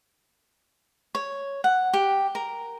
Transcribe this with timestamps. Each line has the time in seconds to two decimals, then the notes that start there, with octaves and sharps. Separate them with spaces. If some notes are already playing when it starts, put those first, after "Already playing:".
1.15 C#5
1.64 F#5
1.93 G4
2.35 A#4